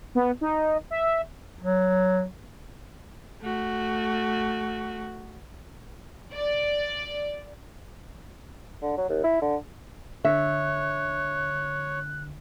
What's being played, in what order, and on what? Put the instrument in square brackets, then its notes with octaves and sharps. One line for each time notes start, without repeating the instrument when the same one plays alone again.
[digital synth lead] B3
D#4
E5
[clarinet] F#3
[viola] A3 F#4
[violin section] D5
[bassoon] D3
F#3
D#2
E4
D3
[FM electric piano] D3 [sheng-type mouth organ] C#5 [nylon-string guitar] E5 [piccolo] F#6